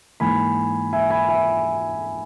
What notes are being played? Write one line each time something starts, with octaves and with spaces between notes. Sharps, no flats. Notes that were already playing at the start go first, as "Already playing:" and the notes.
G#2 E3 A#3 G#5 B5
E5 G#5
G#5 B5
E5 G#5